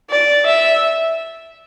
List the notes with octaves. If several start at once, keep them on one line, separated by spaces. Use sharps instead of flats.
D5
E5